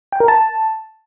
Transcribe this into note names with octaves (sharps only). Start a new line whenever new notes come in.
G5
A#4
A5